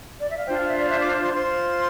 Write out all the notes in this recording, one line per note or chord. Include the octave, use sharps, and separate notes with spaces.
D5
E5
F5
D4 F4 C5 G5
F5
E5
D5
E5
D6
C6
F4 C5 C6